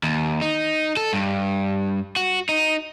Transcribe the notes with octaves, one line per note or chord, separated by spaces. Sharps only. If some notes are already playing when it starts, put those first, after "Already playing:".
D#2
D#4
A4
G2
F#4
D#4